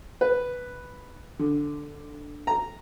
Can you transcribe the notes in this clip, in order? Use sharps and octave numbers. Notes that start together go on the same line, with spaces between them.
B4
D3
A#5